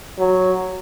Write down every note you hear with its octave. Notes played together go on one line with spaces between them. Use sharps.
F#3